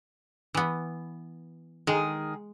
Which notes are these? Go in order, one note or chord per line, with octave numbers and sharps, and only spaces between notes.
E3 B3
D#3 G#3 G#4